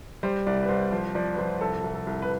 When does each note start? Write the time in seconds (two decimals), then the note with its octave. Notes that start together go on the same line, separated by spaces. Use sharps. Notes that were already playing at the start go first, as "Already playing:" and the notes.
0.23 G3 C5
0.46 C2 D5
0.62 B4
0.69 C2 C5
0.92 F3 C5
1.15 F3 D5
1.34 B4
1.39 F3 C5
1.61 C2 A4
1.84 C2
1.95 A4
2.07 C2
2.22 B4